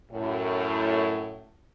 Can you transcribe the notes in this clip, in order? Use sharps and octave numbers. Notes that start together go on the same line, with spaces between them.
F#2 A2